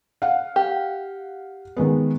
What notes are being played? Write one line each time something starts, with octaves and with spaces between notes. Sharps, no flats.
F5 F#5
G4
D#3 G#3 B3